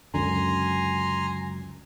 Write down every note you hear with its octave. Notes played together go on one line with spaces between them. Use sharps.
C#2 F#2 D3 G#5 A#5 C6